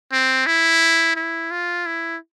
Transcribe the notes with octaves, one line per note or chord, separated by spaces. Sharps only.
C4
E4
E4
F4
E4